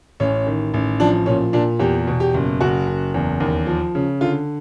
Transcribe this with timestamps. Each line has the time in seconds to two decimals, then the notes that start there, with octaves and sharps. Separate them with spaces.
0.20 A1 C#4
0.47 D#3
0.74 A1
1.00 F3 D4
1.26 A#2 C#4
1.53 A#2 D4
1.80 E2 G4
2.07 B2
2.20 G4
2.34 F#1
2.61 F#1 F#4
2.87 F#1
3.14 E2
3.40 D#2
3.67 F3
3.95 C#3
4.21 D3 F4